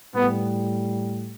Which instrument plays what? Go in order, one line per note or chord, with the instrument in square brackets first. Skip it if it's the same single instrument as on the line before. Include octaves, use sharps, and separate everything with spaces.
[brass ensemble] A2 G3 B3